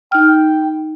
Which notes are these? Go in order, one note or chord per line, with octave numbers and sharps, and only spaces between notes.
D#4 G5 F6